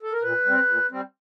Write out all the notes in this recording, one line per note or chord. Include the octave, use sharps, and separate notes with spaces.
A4
A#4
A#2 B4
G3 C4
A#2
G3 C4